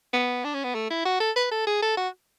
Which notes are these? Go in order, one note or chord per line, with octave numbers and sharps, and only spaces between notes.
B3
D4
C#4
B3
A3
E4
F#4
A4
B4
A4
G#4
A4
F#4